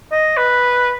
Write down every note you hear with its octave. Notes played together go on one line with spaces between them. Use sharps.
D#5
B4